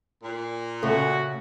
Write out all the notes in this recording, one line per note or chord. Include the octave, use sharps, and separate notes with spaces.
A#2
C#3 A3 F#4 A4 G#5